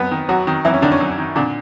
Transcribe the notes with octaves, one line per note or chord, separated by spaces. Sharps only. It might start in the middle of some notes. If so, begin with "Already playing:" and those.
Already playing: F#2 B3 B4
D#3
F#2 F#3 F#4
D#3
F#2 E3 E4
C#4
D3 D#3 D4
C#4
F#2
D#3
A#2 D3 D4